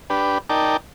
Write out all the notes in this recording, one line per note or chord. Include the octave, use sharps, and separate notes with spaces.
D4 G4 B4
D#4 A#4 D5 G5 A5